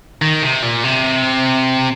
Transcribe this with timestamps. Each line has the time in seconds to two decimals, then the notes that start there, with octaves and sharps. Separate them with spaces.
0.22 D#3
0.42 C3
0.62 A#2
0.83 C3